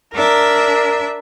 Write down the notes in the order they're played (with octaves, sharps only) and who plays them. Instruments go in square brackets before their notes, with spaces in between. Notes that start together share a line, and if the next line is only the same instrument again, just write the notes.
[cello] D4 E5 [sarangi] A#4